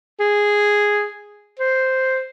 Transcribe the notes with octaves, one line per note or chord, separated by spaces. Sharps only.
G#4
C5